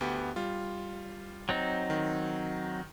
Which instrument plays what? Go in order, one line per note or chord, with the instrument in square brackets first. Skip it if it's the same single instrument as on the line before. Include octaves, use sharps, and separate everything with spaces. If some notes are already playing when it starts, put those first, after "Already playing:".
[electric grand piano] D2 B3 G4
G3 F4
[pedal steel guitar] F#3 C4 D#4
[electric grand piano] D#3